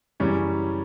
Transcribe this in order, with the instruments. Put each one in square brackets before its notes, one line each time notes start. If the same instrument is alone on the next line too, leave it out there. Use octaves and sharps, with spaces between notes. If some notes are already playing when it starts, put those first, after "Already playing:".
[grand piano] F#2 C#3 E3 G3 C#4